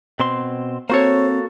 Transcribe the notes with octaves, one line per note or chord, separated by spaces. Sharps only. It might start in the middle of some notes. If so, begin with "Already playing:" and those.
B2 C4 C6
A#3 C4 F#4 A4 C5 C#5